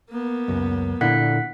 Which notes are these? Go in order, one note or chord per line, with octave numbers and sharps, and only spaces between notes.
A#3 B3
C#2 F#2
A#2 D3 E4 F#5 F#6 B6